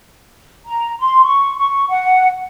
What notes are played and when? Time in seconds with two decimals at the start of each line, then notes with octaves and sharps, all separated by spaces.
0.66 A#5
0.98 C6
1.24 C#6
1.58 C#6
1.89 F#5